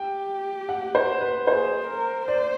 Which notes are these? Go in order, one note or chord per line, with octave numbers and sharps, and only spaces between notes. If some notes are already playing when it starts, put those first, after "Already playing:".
Already playing: G4 G5
F#5
C5
B4
G#4 C5
A#4
C5 D5